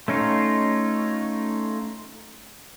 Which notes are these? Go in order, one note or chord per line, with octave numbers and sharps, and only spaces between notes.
A3 C#4 D#4 F4